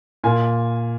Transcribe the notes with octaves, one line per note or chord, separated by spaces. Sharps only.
A#2 A#3 G#5